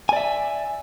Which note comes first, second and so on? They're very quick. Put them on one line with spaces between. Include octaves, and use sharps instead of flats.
G#5 D5 E5